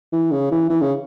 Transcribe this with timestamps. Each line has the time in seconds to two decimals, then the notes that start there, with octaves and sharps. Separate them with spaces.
0.12 E3
0.31 C#3
0.51 E3
0.70 E3
0.81 C#3